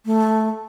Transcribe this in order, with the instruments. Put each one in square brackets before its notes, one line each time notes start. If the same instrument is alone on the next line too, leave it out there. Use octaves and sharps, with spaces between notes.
[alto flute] A3